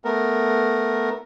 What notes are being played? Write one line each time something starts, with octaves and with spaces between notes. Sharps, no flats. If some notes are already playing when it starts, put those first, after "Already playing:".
A3 B3 A#4